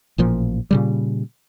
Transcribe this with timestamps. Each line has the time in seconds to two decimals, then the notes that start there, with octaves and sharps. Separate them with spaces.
0.18 A1 A#2 F3
0.71 A#2 C#3 G3